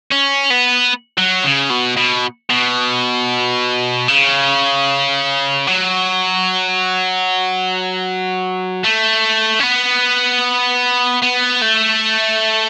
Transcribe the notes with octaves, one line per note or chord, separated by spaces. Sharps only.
C#4
B3
F#3
C#3
B2
B2
B2
C#3
F#3
A3
C#4
B3
B3
A3